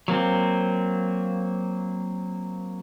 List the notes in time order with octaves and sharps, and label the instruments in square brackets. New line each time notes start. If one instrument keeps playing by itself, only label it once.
[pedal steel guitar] F#3 A#3 C4